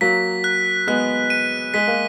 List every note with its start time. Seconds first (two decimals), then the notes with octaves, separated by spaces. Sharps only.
0.01 F#3 A#3 B6
0.44 F#6
0.87 G#3 B3 F#6
1.30 D#7
1.74 G#3 B6
1.88 A#3